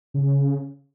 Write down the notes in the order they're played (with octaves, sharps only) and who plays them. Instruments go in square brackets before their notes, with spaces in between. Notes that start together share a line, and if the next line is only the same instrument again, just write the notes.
[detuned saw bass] C#3